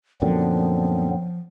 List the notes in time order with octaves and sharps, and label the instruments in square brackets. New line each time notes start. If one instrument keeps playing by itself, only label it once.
[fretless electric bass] F#2 A#2 D3 [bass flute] F3 [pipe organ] F#3 B3 C4